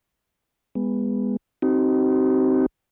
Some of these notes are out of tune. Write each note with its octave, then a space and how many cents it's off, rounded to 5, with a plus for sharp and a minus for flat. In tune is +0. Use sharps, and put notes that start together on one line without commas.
G#3 -30 B3 +0
C4 +0 D#4 +5 G4 -45